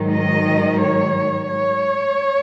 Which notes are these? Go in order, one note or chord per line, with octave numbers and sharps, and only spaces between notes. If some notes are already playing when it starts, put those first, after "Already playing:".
Already playing: G#2 D#3 F#3
D#5
C#5
C#5